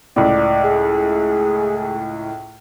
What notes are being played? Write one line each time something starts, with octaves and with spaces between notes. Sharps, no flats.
C#2 A2 D5
G#4